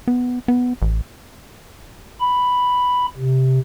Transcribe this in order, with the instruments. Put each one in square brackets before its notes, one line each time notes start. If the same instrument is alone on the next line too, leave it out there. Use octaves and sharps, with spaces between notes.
[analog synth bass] B3
B3
A1
[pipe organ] B5
C3